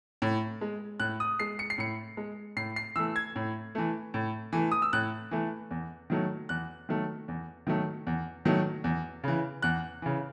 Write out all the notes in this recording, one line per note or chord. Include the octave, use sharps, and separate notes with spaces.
A2
G#3
A2 F#6
D#6
G#3 C7
C#7
C7
A2 C#7
G#3
A2 C7
C7
E3 A3 E6
G#6
A2
E3 A3
A2
E3 A3
D#6
E6
A2 F#6
E3 A3
E2
D#3 F#3 A3
E2 F#6
D#3 F#3 A3
E2
D#3 F#3 A3
E2
D#3 F#3 A3
E2
C#3 E3
E2 F#6
C#3 E3